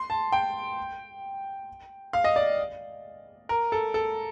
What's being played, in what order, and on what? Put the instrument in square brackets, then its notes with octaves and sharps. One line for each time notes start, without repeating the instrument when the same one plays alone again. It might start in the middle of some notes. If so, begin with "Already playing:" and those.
Already playing: [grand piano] C6
A5
G5
F5
D#5
D5
A#4
A4
A4